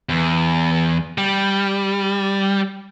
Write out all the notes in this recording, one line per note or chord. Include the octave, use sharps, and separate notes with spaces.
E2
G3